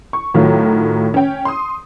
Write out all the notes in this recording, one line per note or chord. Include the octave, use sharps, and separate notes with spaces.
C#6
A2 D#3 F#3 F4
C#4 G5
C6 D#6